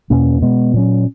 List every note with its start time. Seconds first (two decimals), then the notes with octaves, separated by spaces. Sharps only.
0.10 E2 B2 A#3 C#4
0.42 B2 G#3 B3
0.74 A#2 F#3 C#4